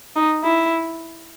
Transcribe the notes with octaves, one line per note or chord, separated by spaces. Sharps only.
D#4
E4